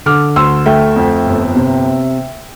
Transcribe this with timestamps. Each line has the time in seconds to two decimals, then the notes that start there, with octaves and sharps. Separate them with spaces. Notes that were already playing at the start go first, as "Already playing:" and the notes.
0.06 D3 D6 F6
0.36 D2 C6 E6
0.66 A3 E5 G5
0.96 F2
1.26 G1
1.56 C3